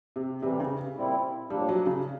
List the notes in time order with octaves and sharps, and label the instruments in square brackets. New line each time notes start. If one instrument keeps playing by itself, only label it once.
[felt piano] C3
[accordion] A2 E3 G3 [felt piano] C3
[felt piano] C#3
[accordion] A#2 G3 C4 E4
[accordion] A2 F3 A#3 D4 [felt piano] G3
[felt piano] F#3
C#3